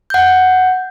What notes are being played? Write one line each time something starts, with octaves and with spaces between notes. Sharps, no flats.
F#5 G6